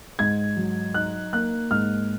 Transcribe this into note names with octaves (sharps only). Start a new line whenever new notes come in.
G#2 G#6
F#3
D#4 F#6
A#3 F#6
G#2 F6